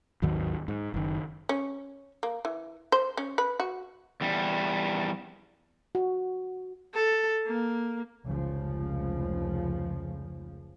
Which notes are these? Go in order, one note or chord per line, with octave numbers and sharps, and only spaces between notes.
G#1 D#2 D#3 F#3
G#2
F#1 D#3
C#4
A#3
E3
C5
C#4
B4
F#4
E2 G3
F#4
A4
A#3
F1 C#2 C#3 F3